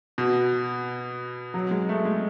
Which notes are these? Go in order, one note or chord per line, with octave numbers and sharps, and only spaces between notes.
B2
F#3
G#3
A3
G#3